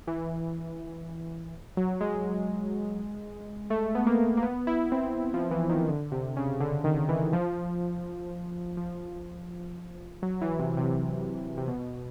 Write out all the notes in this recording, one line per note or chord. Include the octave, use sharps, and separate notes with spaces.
E3
F#3
G#3
A3
B3
A#3
A#3
B3
E4
C4
F3
E3
D#3
D3
C3
C#3
D3
D#3
E3
F3
F3
F#3
E3
C3
C3
C3
B2